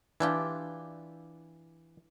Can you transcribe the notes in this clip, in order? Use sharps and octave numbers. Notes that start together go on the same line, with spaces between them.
E3 D4 F4 G4